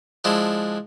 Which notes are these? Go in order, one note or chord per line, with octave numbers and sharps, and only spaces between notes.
F3 G#3 D4 E4